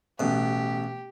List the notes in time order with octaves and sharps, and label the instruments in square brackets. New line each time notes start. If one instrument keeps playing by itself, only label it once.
[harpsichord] A1 B2 [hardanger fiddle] G4